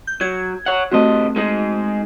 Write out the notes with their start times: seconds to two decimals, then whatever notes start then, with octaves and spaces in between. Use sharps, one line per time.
0.07 G6
0.21 F#3 G#6
0.66 C#5 F#5
0.91 C2 G2 A3 C4 F#4 D#5
1.36 G#3 D#4 G#4